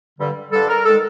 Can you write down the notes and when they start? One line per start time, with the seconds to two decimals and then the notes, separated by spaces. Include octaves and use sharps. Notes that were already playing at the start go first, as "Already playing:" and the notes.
0.19 G2 D3 G3
0.51 G2 D3 G3 A4
0.68 A#4
0.85 D#3 G#3 A4